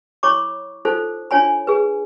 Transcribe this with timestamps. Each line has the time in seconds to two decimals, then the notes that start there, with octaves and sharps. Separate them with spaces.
0.23 E4 C#5 B5 C#6 D6
0.85 D#4 F4 A4 C5
1.31 D4 F4 C#5 G#5 B5
1.67 G#4 B4